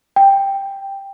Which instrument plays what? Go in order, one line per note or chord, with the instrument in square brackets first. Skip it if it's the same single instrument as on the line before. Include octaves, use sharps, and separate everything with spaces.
[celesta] G5